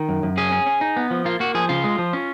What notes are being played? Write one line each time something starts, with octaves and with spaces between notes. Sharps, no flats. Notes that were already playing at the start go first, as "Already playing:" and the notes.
Already playing: D#3
F#2
F#2
C#4 G#4
C#4
C#4
D#4
B3
F3
A#3 F4
A#3 F#4
F3 G#4
C#3 F4
G#3
F3
C#4